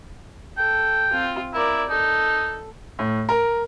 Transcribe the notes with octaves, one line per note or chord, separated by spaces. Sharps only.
A4 G5
C4 F4
E4 A#4 D5
D#4 A4
A2
A#4